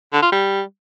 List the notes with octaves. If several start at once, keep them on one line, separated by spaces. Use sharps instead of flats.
D3
F4
G3